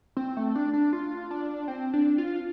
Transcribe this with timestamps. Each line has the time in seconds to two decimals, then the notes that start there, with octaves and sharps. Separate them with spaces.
0.17 C4
0.37 A3
0.55 D4
0.73 D4
0.93 F4
1.31 D4
1.68 C4
1.94 D4
2.18 F4